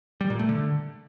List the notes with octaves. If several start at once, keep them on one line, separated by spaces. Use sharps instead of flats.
G3
A#2
A3
D3